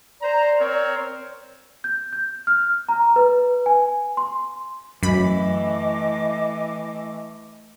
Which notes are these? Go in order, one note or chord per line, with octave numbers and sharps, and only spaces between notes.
C5 D5 A#5
C4 A#4 C#5
G6
G6
F6
A#5
B4
G#5
C6
F#2 E3 A3 D#5 B5 D6